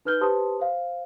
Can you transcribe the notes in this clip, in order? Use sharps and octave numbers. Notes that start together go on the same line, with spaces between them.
D#4 B4 F6 G6 G7
G4 B4 C5 A5 C6 D#6
C5 F5